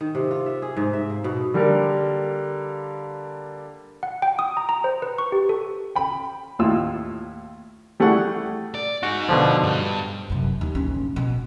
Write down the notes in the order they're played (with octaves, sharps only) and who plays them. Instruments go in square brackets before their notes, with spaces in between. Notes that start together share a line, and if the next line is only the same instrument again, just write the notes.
[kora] D#3
C3
F4
E5
G#4
G#2
E5
A#3
B2
[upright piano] D3 G3 A#3 A#4
[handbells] F#5
G5
D#6
A#5
A#5
C5
B4
C#6
G4
A4
[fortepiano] G5 B5
D#2 A2 E4 F4 E6
G3 A3 E4 G#4 F#5 C#6
[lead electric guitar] D5
[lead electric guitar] D#4 G#4 [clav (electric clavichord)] F#4
[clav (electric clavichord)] B2 D3 F3
[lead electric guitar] G2
[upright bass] F#2 C3
D#2
A#1 C#4
B2